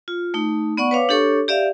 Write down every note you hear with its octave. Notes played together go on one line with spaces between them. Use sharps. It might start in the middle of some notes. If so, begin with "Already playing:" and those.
F4
A3 D#4
B3 D5 F#5 C#6
B4 C#5 F5 D6
D4 G4 A4 C#5 C#6
G4 D5 E5 F5